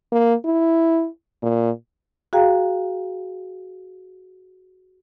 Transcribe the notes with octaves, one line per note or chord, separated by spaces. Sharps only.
A#3
E4
A#2
F#4 G#4 F5 G5 A#5